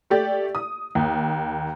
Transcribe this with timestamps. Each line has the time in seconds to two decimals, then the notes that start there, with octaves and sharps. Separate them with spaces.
0.10 A3 G4 D5
0.55 D#6
0.95 D#2